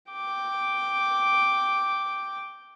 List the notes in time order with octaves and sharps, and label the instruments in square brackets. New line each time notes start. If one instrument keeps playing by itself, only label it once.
[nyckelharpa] G5 D6